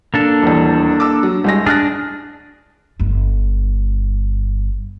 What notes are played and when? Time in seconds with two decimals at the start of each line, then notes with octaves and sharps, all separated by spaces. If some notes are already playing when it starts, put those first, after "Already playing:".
0.14 A#3 D4 A4
0.42 D#1 E2
1.00 D6 E6
1.23 F#3
1.44 C2 G#3 A#6
1.66 D4 G#4 F6 F#6 A#6
3.00 G1 G2